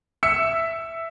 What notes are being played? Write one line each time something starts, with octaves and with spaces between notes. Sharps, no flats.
E5 E6 C#7